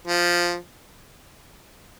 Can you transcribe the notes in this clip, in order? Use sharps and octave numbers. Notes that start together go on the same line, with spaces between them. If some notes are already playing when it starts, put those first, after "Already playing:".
F3